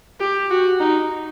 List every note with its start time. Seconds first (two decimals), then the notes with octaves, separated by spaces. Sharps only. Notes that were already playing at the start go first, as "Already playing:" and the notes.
0.20 G4
0.50 F#4
0.80 D#4